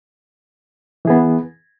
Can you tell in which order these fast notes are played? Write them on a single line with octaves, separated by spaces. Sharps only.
E3 G#4 B3